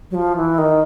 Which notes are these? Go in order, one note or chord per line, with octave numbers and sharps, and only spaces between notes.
F#3
F3
E3
D#3